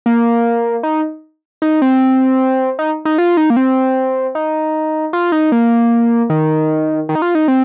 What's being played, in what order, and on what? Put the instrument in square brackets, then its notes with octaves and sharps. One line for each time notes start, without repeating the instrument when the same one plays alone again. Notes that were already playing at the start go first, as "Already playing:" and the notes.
[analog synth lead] A#3
D#4
D#4
C4
D#4
D#4
F4
D#4
A#3
C4
D#4
F4
D#4
A#3
D#3
D#3
D#4
F4
D#4
C4